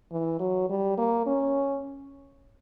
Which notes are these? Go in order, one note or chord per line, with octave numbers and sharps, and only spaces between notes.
E3
F#3
G3
A#3
C#4